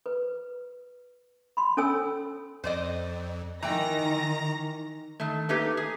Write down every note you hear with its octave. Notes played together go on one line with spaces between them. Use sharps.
B4
B5 C6
C#4 A4 C#5 G#5 E6
F2 C5 D5 D#5
D#3 E3 G5 A#5 A#6
D#3 A3
A3 A#3 D#4 G4 B4
G#4